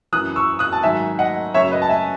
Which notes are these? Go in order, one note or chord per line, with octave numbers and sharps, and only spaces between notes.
F#2 E3 D#6 F#6
C#6 E6
D#6 F#6
A5
G#2 D#3 F#3 E5 G#5
D#5 F#5
F#2 C#3 F#3 C#5 E5
B4 D#5
A5
E5 G#5